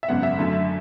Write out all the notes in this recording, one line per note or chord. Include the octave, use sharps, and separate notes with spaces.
E5
G#1 F#2 C#3 G#3 B3 F#5
E5
F#2 D3 A3